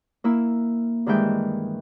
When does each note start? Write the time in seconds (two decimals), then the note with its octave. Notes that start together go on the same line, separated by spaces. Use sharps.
0.24 A#3 E4 E6
1.06 G2 D#3 E3 G#3 E5 G5